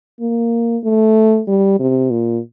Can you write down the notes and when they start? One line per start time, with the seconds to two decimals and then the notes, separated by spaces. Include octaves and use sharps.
0.20 A#3
0.84 A3
1.47 G3
1.80 C3
2.11 A#2